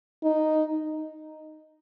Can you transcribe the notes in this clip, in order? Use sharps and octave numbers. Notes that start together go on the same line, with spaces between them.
D#4